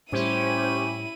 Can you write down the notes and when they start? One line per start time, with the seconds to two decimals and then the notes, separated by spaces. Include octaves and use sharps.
0.12 A2 G3 C#4 E4 G4 C5 D#7